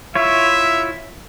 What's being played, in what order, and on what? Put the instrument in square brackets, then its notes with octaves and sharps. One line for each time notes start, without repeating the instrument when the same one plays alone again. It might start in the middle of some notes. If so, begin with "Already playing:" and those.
[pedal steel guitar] E4 F4 C#5 [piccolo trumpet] E5